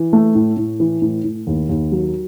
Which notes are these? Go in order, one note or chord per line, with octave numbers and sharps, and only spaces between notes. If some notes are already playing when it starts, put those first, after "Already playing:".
Already playing: E3
A3
A2
A2
E3
A2
A2
D#2
D#2
F#3